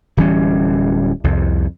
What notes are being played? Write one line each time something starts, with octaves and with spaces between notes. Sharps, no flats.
D1 E3 G3 C#4
C2 F2